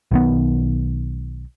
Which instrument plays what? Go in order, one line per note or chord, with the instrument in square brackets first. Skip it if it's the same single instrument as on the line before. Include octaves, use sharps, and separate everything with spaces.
[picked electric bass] B1 D#3 B3